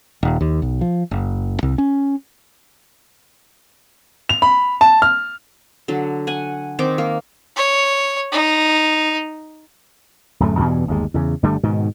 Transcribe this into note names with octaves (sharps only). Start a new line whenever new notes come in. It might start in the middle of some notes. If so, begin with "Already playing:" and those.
D#1
D#2
B1
F3
F#1
C2
C#4
F7
B5
A5
F6
D3 F#3
F#5 G#5
D#3 C4 D#4 D6
A#3
C#5
D#4
D1 F#2 A3
E2 G2 B2 E3
G1 D#2 G#3
E2 C#3
G1 D3 G3 A3
G#2 B2 D#3